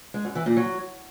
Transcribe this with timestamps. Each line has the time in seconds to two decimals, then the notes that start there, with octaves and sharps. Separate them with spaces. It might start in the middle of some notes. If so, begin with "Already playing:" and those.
0.14 G#3
0.25 F#2
0.35 E3
0.46 A#2
0.57 F#3